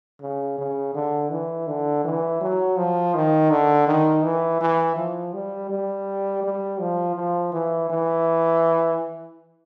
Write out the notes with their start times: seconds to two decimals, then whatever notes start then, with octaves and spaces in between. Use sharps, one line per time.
0.21 C#3
0.58 C#3
0.95 D3
1.31 E3
1.67 D3
2.04 E3
2.41 F#3
2.77 F3
3.15 D#3
3.50 D3
3.87 D#3
4.23 E3
4.61 E3
4.97 F3
5.33 G3
5.70 G3
6.43 G3
6.80 F3
7.16 F3
7.52 E3
7.90 E3